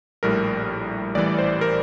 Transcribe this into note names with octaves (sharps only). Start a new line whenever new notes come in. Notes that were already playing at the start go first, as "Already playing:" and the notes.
A#1 A2 G3 A#4
A1 A2 E3 G3 D5
C5
A#4